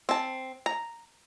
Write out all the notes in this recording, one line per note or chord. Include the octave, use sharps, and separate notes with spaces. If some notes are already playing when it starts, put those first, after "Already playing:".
C4 A5
A#5